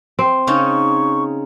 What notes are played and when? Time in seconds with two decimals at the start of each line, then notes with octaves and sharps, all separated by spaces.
0.19 C4
0.47 C#3 C#4 D#4 C#6